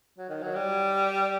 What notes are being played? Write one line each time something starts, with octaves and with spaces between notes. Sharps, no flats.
F#3
D#3
F#3
G3